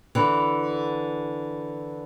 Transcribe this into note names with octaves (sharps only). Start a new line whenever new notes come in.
D3 E3